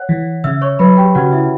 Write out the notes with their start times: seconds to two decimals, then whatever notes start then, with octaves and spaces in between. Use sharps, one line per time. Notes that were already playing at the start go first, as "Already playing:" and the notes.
Already playing: C#5 F#5 F#6
0.09 E3
0.44 C#3 E5 E6
0.61 C#5 C#6
0.79 F#3 B4 B5
0.97 G4 G5
1.15 C#3 F#4 F#5
1.33 E4 E5